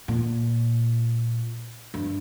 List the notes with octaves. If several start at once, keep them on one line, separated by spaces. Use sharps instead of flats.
A#2
G2